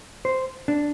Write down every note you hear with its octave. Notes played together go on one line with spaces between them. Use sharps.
C5
D4